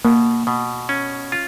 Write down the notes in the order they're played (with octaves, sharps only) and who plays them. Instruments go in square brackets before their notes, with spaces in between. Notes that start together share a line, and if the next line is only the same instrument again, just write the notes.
[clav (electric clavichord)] B2 [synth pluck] A#3
[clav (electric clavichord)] B2
C#4
F4